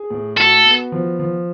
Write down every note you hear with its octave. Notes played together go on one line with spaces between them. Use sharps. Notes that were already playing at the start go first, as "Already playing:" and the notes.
Already playing: G#4
A2
F#4 A4
B3
F3
F3